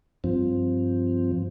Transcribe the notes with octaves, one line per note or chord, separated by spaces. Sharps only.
G2 F3 C4